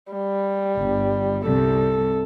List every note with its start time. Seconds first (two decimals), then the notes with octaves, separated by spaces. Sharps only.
0.13 G3
0.78 G1
1.46 C2 A4